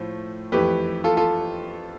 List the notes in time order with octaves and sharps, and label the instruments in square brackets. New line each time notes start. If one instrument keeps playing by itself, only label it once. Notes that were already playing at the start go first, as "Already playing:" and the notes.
Already playing: [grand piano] A2 F3 A3
F2 E3 A3 G4 B4
F4 A4
F4 A4